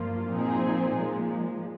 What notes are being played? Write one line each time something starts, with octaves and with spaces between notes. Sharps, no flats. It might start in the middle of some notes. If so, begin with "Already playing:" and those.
Already playing: G2 F3 A#3 F4
A#2 F3 C4 D#4 G#4
A#2 F3 G#3